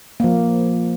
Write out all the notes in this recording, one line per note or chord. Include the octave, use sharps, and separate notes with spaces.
F3 A#3